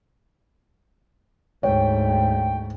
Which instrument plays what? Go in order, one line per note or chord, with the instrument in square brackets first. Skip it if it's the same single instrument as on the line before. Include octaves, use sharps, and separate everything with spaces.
[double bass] D2 G#2 [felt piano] C#5 [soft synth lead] G5